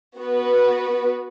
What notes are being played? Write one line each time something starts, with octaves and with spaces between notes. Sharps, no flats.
B3 F#4 B4